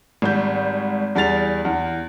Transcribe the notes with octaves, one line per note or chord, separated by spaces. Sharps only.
G#1 G3 G6
E2 G3 G#4 A6 F7
E2